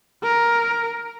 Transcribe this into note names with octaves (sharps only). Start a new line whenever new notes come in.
A#4